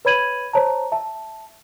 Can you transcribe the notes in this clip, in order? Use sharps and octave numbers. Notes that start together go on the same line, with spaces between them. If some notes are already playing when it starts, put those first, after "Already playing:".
B4 C#5 B5 G#6 D#7 F#7
C5 C#5 A5 A#5
E5 A5